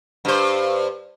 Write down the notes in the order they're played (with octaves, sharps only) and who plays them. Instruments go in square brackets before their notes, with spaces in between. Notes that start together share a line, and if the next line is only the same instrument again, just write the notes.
[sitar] G2 C5